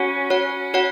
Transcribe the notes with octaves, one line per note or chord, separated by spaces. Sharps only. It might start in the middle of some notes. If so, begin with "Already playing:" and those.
Already playing: C#4 F#4 C#5 F#5
F#4 C#5 F#5
F#4 C#5 F#5